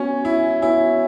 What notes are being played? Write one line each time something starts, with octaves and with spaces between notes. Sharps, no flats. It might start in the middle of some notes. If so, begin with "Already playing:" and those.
Already playing: B3 C#4 F#4 C#5 G#5
E4
B3 E4 F#4 C#5 G#5